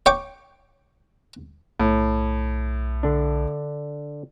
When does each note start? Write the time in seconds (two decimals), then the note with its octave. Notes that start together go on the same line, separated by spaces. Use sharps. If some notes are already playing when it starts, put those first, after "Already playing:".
0.06 C#5 G5 C#6 D6
1.80 B1 A2
3.03 D3 D4